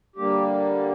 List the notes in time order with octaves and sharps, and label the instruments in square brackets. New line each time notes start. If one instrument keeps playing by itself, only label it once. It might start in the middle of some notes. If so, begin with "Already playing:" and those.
[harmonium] D3 G3 A#3 G4